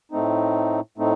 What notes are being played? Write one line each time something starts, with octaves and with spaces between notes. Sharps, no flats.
A2 A3 C4 D#4
A2 A3 C4 D#4